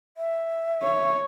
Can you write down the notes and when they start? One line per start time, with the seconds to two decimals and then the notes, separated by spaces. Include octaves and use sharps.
0.17 E5
0.82 C#5